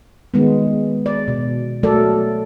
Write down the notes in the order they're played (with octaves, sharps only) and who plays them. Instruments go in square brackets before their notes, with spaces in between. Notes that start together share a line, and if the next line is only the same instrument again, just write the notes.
[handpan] D#3 G#3 B3
D5
B2
F#3 A3 A4 A#4 D5